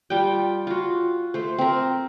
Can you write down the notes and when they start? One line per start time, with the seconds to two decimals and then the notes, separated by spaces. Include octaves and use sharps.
0.10 G3 F4 G5
0.67 F4 F#4
1.34 A3 C5
1.58 C4 A#4